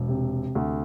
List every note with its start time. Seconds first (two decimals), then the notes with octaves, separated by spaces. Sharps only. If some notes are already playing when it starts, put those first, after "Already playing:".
Already playing: E1
0.08 C3
0.55 D2